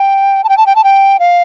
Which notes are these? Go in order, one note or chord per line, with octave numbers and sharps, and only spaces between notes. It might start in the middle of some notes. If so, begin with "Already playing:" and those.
Already playing: G5
A5
G5
A5
G5
A5
G5
F5